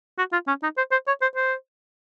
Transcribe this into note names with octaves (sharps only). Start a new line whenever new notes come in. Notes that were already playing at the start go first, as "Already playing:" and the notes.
F#4
F4
C#4
D#4
C5
C5
C#5
C5
C5